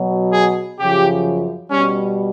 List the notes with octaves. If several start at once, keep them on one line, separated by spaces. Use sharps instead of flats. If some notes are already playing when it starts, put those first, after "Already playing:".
Already playing: B2 F#3
G#4
F#2 C#3 F3 G4
B2 G3 C#4